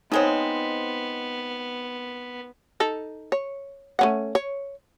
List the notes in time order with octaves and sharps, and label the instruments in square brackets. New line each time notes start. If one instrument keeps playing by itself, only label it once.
[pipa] F3 G#3 C4 [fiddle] B3 [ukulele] D#4 C#5
[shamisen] D#4 A4
C#5
A3 C#4 F#5
C#5